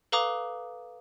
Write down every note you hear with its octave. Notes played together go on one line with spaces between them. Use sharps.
A4 B4 F5 A#5 D6 D#6